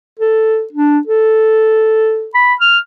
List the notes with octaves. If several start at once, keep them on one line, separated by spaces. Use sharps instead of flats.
A4
D4
A4
B5
F6